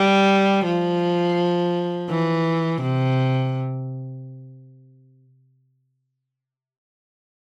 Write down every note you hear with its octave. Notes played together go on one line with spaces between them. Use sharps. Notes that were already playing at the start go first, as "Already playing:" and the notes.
Already playing: G3
F3
E3
C3